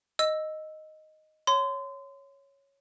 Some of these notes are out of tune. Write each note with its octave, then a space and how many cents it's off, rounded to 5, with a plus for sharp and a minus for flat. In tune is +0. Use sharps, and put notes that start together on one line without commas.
D#5 +0 E6 +0
C#5 +0 C6 -30